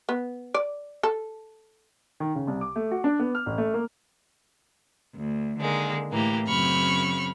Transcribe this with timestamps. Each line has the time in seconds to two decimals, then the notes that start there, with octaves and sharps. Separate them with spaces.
0.09 B3
0.54 D5
1.03 A4
2.20 D#3
2.35 C#3
2.47 C2
2.61 D6
2.76 A3
2.91 F#4
3.04 D4
3.19 B3
3.35 F6
3.46 A1
3.58 A3
3.74 A#3
5.15 D2
5.58 D3 D#3 G#3 A#3
6.10 A2 E3 A#3 G4
6.46 F#2 C#3 C4 B5 C#6 F6